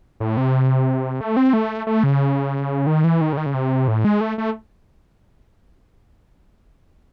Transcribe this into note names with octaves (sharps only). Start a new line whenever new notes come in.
A2
C3
A3
C4
A3
A3
C#3
D#3
E3
D#3
C#3
D#3
C#3
C3
A2
G#3
A3
A3